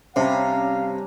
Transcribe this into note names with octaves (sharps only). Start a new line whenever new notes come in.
C3 G3 C#4 D4 F5 A#5